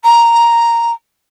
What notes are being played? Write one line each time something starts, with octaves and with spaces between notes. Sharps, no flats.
A#5